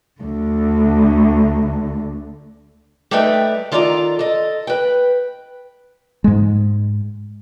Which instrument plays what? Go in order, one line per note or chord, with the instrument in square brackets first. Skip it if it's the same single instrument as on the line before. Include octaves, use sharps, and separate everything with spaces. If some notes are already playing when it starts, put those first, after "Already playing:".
[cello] D2 D3
[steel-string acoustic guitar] G3 A3 D#4 B4 E5 G5
D#3 F4 A4 D5 G5 A#5
A4 D#5
B4 G5
[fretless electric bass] G#2 G#3